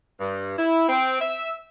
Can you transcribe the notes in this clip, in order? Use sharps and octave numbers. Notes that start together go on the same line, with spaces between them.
G2
E4
C4
E5